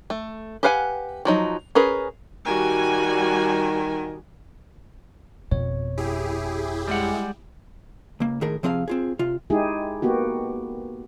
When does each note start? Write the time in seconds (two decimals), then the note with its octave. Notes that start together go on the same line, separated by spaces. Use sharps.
0.10 A3
0.63 G4 B4 F5 F#5 G#5
1.25 F3 F#3 D#4
1.75 C#4 G#4 A#4 B4
2.46 D#3 G3 F#4 G#5
5.51 G1 F2 B2 C#5
5.98 E4 G4 G#4
6.88 G3 G#3 F#5
8.20 C#2 A#3
8.41 A2 D#3 G#4 A#4
8.63 C3 F3 C4 G#4 F5
8.88 C4 F4 G#4
9.19 C3 F4
9.50 G#3 D#4 E4 G4 G#4
10.02 A#3 B3 F#4 G4